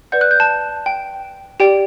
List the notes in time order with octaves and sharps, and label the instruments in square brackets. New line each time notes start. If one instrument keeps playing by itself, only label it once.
[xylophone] B4 D5 F#5 G6
F#6
G6
A5
G5
G4 D5 G5